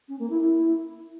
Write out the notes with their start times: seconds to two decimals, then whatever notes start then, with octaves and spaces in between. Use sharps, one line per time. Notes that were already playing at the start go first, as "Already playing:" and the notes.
0.08 C#4
0.19 A#3
0.30 E4
0.40 E4